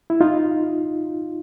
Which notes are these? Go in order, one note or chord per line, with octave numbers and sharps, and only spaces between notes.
E4
D#4 F4